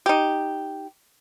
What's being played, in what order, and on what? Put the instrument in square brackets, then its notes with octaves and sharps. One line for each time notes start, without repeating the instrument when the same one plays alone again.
[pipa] D#4 G4